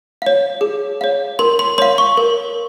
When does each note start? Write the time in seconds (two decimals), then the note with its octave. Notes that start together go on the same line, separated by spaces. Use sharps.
0.22 C#5 F5
0.61 G#4
1.01 C#5 F5
1.39 A#4 C6
1.59 C6
1.78 C#5 F5 C6
1.98 C#6
2.17 A#4